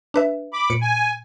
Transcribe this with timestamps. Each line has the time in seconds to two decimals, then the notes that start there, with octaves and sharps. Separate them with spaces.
0.14 D4 B4 E5
0.53 B5 D6
0.70 A#2 C#7 D7
0.81 G#5